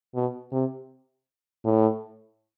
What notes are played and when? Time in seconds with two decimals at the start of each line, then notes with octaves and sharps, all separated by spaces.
0.15 B2
0.52 C3
1.64 A2